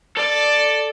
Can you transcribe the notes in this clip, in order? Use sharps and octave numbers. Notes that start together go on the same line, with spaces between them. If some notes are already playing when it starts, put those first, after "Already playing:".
A4 D5